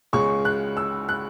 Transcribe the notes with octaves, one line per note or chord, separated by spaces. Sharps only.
C#2 C#3 G#3 C#4 C#6
F#6
E6
F#6